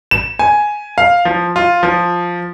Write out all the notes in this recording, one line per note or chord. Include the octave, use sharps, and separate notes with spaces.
E7
G#5
F5
F3
F4
F3